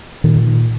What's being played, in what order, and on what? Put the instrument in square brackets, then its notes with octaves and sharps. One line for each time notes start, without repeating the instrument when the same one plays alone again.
[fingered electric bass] A#2 D#3